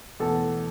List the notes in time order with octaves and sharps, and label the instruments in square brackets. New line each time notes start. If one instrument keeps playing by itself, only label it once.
[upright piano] E2 B2 A3 A4